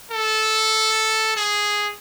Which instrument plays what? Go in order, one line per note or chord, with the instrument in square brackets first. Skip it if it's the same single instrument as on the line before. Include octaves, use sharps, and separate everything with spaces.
[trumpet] A4
G#4